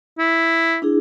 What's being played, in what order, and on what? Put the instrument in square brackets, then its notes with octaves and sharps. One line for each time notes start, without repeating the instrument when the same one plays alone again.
[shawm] E4
[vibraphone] D4 E4 G#4